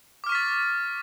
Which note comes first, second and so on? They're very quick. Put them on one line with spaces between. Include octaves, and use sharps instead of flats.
D6 F6 C#6 B6 A6